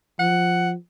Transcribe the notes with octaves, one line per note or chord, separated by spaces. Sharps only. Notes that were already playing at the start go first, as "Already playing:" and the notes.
F3 F#5